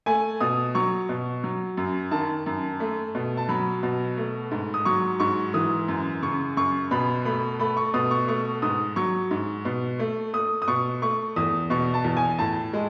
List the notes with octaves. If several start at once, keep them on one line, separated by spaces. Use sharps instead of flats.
A3 G#5
B2 D#6
F#3 C#6
B2
F#3
F#2
D#3 A5
F#2
A3
B2
A5
F#3 B5
B2
A3
G#2
D#6
F#3 C#6
G#2 C#6
E3 D#6
F#2
C#3 C#6
F#2 C#6
B2 B5
A3 B5
A3 B5
C#6
B2 D#6
C#6
A3 C#6
G#2 D#6
F#3 C#6
G#2
B2
A3
A3 D#6
D#6
B2 C#6
A3 C#6
E2 D#6
B2 C#6
A5
E2
G#5
A2 A5
G#3